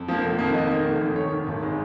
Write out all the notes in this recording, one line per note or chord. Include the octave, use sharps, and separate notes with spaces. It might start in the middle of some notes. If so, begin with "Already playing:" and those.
Already playing: F2
F3 A#3
F1
F2 D#3 A#3
F1 D#5
F2 D#3 A#3
F1
D#2 D#3
F1 C#5
D#2 D#3
G#1
D#3 G#3